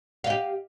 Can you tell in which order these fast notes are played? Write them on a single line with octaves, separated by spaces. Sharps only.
F5 D#5 G4